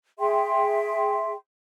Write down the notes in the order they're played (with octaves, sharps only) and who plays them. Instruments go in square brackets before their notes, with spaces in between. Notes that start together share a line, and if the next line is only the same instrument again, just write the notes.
[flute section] G#4 E5 G5 C6